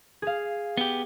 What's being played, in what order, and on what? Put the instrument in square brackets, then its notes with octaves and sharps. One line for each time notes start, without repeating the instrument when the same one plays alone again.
[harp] G#4 F5
[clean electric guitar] B3 G4